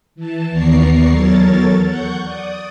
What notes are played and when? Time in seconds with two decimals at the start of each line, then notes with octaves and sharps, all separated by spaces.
0.15 E3 A5
0.51 D#2 B3 D5 A#5 C#6 C7
1.07 E2 F#3 A4 A#4 C#5 A6
1.85 F#5 C#6 G6
2.23 D5 D#6